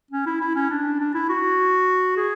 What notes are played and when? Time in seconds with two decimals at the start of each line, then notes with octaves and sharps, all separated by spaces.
0.11 C#4
0.26 E4
0.41 E4
0.55 C#4
0.70 D4
1.00 D4
1.14 E4
1.29 F#4
2.17 G#4